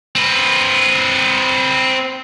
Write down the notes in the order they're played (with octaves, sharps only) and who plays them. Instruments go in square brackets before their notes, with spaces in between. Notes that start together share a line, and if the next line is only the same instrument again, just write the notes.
[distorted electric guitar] C4 B4